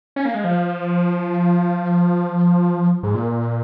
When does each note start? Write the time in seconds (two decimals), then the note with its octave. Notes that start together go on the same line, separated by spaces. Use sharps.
0.16 C#4
0.25 A#3
0.34 G#3
0.44 F3
3.03 G#2
3.15 A#2